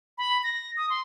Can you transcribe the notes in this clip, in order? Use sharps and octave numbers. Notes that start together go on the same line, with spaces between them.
B5
A#6
D#6
C6